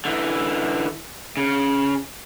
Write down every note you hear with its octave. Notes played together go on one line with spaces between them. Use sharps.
D3 E3
C#3